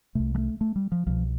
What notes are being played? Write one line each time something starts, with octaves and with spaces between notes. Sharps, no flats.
C2 C3 A3
G3
A3
A3
G3
F3
C2 B2 F3